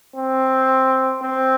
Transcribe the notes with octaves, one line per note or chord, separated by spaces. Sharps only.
C4
C4